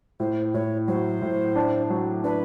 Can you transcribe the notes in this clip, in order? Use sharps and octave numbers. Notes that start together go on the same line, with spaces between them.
A2 C5
A2 C#5
F#3 C5
A2
D4
F#3
D4 B4